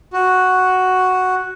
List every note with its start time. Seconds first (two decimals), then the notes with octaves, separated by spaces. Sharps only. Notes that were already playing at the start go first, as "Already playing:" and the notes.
0.13 F#4